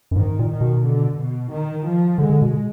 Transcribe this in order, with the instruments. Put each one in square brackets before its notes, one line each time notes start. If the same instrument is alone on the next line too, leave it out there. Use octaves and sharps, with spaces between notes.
[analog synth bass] F#2
[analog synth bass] G#2 [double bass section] D#3
[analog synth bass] A#2
[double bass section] D#3
[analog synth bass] B2
[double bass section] D3
B2
D#3
F3
[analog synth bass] D3 [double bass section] G#3
[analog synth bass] D3
B2